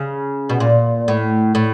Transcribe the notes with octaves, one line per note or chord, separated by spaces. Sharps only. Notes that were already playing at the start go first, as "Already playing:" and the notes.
Already playing: C#3
B2
A#2
A2
A2